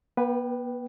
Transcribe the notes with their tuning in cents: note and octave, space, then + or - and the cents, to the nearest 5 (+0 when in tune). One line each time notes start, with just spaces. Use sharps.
B3 -45 B4 +0 G5 -10